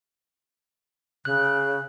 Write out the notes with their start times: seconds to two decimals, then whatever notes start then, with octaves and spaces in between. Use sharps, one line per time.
1.25 C#3 F#6